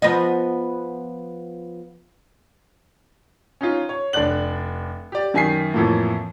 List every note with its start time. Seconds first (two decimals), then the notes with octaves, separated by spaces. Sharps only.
0.02 F3 B3 D#5
3.61 C#4 D#4 F4
3.89 C#5
4.13 F1 D4 D5 F#6 F#7
5.12 G4 D5
5.34 F#2 D#3 G#5 B6 C7
5.73 F2 A2 E3 F3 A3 A#3